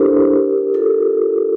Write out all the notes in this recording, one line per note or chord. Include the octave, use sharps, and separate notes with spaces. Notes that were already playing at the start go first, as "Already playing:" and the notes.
Already playing: D4 E4 G4 A4 A#4 C5
F4 A4